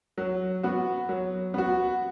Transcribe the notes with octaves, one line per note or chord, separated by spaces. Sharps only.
F#3
B3 F#4
F#3
B3 F#4